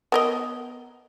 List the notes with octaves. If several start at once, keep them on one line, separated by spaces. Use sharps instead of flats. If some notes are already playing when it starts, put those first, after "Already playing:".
B3 A#4 D#5